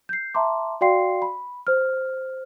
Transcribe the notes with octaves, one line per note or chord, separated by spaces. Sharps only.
G6 C7
E5 A5 A#5 C6 D6
F#4 D5 F5 G5 C6 C7
B5
C5 F6